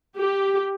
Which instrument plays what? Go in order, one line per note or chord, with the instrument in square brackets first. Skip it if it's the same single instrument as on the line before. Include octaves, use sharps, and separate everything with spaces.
[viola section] G4